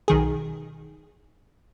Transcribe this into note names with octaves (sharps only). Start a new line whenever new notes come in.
B1 D#3 G#4